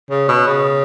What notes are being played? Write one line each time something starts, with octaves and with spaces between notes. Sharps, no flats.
C#3
B2
C#3